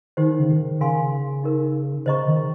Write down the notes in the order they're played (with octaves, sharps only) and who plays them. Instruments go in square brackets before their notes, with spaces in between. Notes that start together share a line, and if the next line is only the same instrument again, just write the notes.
[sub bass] D#3 [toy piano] D#4 G4 C5
[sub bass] C#3
D#3
[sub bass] C#3 [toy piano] A#4 F5 G#5 C6
[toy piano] D#4 G4 A#4
[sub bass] C#3 [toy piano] C5 D#5 A#5 C#6
[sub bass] D#3